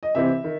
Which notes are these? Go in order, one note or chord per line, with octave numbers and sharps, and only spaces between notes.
D#5
C3 E3 C4 E5
D#3